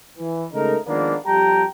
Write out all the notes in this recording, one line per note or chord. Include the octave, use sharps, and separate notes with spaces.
E3
C#3 G#3 A3 D#4 A#4
D#3 F3 G#3 A#3 B3 D4
F2 G3 G4 G5 A5 A#5